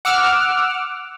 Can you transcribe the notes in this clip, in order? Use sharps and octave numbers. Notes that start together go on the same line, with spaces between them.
F#5 D6 E6 F6